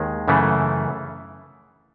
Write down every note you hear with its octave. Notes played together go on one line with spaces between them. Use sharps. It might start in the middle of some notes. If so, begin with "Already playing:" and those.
Already playing: D#2 D#3 G#3
F#2 C#3 E3 A3